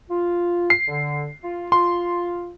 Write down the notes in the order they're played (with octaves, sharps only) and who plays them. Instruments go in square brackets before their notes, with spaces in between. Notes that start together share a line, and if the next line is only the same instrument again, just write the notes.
[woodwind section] F4
[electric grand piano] C7
[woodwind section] D3
F4
[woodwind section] F4 [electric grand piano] C6